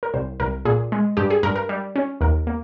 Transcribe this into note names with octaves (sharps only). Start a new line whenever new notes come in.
A#4
C2 C5
C2 A#4
A#2 G#4
G#3
G2 G4
G#4
G2 A#4
A#4
G3
C#4
D#2 A#4
A#3